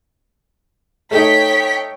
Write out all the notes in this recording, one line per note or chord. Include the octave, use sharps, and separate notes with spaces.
A3 D#4 C#5 G5 B6